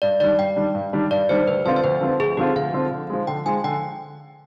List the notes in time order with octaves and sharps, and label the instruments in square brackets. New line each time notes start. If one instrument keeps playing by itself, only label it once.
[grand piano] G2 [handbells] D5
[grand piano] D#3 G3 D4 [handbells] D5
[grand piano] G2 [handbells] G5
[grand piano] D#3 G3 D4
G2
D#3 G3 D4
[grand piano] G2 [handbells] D5
[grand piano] D#3 G3 D4 [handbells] C5
[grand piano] D2 [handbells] B4
[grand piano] D3 F3 C4 F4 [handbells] C5
[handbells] C5
[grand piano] D2 [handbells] B4
[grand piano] D3 F3 C4 F4
[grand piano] D2 [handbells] G#4
[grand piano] D3 F3 C4 F4 [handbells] G4
[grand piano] D2 [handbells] F5
[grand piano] D3 F3 C4 F4
D3
F3 G#3
[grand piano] D3 [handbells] G5
[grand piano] F3 G#3 [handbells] G#5
[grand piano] D3 [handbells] G5